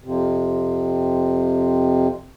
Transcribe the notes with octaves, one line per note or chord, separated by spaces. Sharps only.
F2 C3